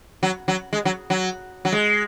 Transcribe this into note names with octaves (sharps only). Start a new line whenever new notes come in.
F#3
F#3
G#3
F#3
F#3
F#3
G#3